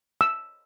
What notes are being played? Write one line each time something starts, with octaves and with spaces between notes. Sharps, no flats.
E6